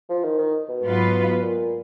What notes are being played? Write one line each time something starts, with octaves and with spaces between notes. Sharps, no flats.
F3
D#3
D#3
B2
G#2 F#3 B3 F4 B4
A#2